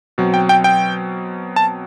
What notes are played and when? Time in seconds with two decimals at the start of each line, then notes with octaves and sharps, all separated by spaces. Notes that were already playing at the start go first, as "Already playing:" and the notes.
0.18 B2 F#3 C4
0.34 G5
0.49 G5
0.64 G5
1.56 A5